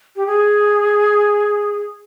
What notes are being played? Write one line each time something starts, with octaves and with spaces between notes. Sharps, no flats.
G4
G#4